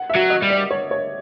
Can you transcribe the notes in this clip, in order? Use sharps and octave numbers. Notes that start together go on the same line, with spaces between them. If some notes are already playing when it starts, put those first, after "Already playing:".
Already playing: F#5
E5
F#3
D#5
G3
D5
C#5
C#5